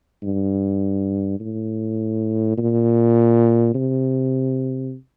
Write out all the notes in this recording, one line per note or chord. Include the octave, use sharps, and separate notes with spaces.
G2
A2
A#2
C3